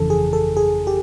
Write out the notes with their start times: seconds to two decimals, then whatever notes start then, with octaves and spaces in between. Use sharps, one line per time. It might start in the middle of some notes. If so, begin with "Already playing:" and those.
Already playing: G1 F2 C#3 E3 A4
0.10 G#4
0.33 A4
0.57 G#4
0.87 G4